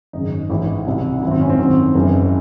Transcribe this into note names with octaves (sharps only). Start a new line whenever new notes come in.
G#1 F#2 C#3 D#4
A1 G#2 E3 E4
C2 C3 D#3
G#1 F#2 D#3 E4
C4
C#4
C4
G#1 F#2 D#3
F#1 F#2 E3